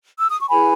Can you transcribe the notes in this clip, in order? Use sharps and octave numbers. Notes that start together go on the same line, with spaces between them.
E6
D#6
C#6
E4 G#4 B4 G#5 B5